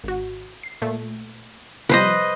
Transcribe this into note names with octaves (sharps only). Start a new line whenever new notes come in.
G#1 F#4
C7
A#2 A3
C3 F3 G3 B4 C5 D#5